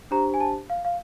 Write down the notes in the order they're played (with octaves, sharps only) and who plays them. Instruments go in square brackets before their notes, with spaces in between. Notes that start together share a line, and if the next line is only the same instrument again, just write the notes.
[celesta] D4 G4 C5 A#5
G#5
A5
F5
F5